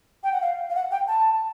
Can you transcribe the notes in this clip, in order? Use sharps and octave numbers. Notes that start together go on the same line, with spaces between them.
G5
F#5
F5
F5
F#5
G5
A5